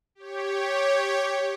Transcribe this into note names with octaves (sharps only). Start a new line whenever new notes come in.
G4 C#5